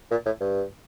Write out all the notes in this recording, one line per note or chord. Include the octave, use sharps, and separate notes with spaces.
A#2
A2
G2